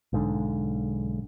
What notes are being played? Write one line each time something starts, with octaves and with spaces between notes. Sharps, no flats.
B1 G#2 D3